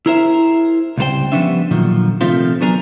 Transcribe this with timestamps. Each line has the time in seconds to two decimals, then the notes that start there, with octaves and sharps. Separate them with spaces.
0.06 E4 G#4 A#4 C5 E5
0.98 C#2 C3 G3 B4 C5 G5
1.32 F3 G3 B3 C#4 D4 E5
1.71 A#2 D3 D#3 F3 F#3
2.21 C3 D#3 F3 A3 C4 F4
2.61 F#3 B3 D4 G#4 A#4